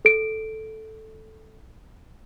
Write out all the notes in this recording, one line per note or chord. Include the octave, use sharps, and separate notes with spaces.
A4 D7